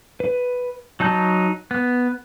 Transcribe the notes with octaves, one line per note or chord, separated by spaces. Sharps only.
B4
F#3 D#4 A5 G6
B3